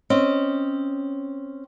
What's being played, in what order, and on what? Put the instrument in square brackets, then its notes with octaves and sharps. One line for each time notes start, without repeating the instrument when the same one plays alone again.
[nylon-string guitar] C4 C#4 D#5